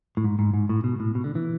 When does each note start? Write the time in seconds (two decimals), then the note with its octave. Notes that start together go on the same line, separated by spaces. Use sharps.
0.17 A2
0.24 G#2
0.39 G#2
0.54 G#2
0.69 A2
0.84 B2
1.00 A2
1.15 B2
1.24 D3
1.35 E3